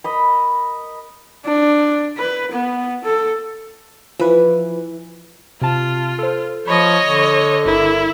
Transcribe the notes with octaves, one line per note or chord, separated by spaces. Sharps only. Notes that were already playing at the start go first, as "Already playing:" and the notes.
A#4 D#5 B5
D4
B4
B3
A4
E3 F3 B4
C3 F4 A5
A4 C5
F3 C#5 D#5 B5 C#6
D3
G1 E4 A#4